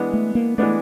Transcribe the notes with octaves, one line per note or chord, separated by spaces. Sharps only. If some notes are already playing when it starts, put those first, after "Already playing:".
Already playing: E3 G#3 B3 D4
A3
A#3
E3 G#3 A3 B3 D4